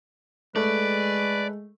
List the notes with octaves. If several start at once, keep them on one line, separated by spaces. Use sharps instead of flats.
G#3 A3 B4 D5